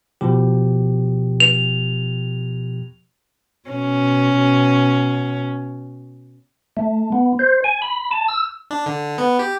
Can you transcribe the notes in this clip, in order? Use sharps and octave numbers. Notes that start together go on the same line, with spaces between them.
B2 F3 G4
F7
B2 C#4
A3
B3
C5
G#5
B5
A5
E6
D4
D3
B3
G4